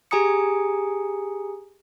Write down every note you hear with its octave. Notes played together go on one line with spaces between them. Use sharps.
G4 G#4 G#5 A#5 D#6 C#7